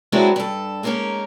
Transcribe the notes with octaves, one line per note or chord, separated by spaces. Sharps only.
F#3 G#3 B3 C4 D4 E4
G2 A4
G#3 A#3 C#4 D#4 A#4